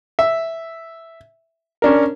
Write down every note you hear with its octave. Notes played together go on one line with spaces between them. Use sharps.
E5
C#4 D4 A#4